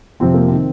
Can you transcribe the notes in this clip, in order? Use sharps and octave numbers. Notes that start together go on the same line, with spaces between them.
F2 C3 F3 C4
A#3
D#3 C4